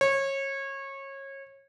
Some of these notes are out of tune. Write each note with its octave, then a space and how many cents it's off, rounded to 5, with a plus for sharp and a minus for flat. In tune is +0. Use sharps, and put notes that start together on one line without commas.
C#5 -25